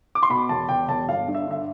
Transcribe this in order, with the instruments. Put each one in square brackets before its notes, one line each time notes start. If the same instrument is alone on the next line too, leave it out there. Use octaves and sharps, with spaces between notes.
[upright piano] D6
C6
B2 B5
E1 A5
E1 G5
E1 A5
G1 F5
G2
E5
D3 E5